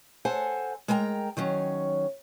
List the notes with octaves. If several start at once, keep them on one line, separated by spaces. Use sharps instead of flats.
A4 C5 F#5 G#5 A5
G#3 A#4 G5 G#5 A#5
D#3 F#3 C#4